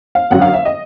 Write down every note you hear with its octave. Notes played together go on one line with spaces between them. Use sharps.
F5
F#1 F#2 D3 F#3 F#5
F5
E5
D#5